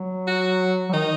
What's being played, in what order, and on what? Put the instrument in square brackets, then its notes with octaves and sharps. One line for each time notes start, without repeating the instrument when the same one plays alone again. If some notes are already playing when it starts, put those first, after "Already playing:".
Already playing: [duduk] F#3
[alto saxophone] F#4
[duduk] F#3
[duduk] D#3 [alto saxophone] D#4